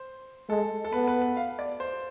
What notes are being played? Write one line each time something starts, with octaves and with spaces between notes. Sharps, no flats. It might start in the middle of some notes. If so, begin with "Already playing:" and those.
Already playing: C5
G#3 A4
A4
B3 B4
B4
B4
F5
D5
C5